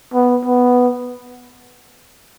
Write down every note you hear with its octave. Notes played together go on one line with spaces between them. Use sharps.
B3
B3